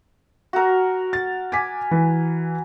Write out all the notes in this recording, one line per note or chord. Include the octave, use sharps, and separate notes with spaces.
F#4 A#4
A6
G#5 D6 B6
E3